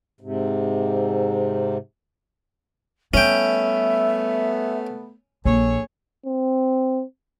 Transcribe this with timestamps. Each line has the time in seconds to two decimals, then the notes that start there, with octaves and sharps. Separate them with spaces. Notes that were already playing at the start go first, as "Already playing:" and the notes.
0.21 G#2 C3
3.14 G3 A3 B3 C#4 E5 G5
5.45 A#1 G#4 A4 C#5
6.26 C4